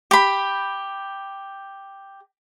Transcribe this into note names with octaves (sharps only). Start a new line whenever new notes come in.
G4 B5